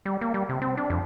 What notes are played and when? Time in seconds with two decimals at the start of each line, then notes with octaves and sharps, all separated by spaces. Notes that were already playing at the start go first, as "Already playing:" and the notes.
0.05 G3
0.21 A#3
0.34 G3
0.49 C3
0.62 C4
0.77 D4
0.90 F2